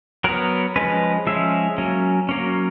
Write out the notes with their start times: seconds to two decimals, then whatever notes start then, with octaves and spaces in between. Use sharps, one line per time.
0.24 F#3 B3 A#4
0.76 F3 G#3 C#4 B4
1.27 F3 G#3 C#4 E5
1.78 F#3 A#3 C#4
2.29 F#3 A#3 C#4